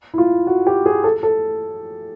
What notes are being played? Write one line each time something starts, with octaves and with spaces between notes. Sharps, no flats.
E4
F4
F#4
G4
G#4
A4
A4